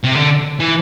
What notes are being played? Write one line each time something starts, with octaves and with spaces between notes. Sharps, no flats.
C3
D3
E3